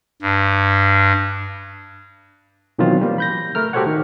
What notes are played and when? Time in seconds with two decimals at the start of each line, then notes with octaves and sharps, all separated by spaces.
0.22 G2
2.79 B2 D#3 E3 F#3 C4 F4
3.01 G3 A#3
3.18 B5 G6 A#6
3.55 A3 A#4 F6
3.73 F#4 G4 A4 C5 C#5 F#5
3.86 D#3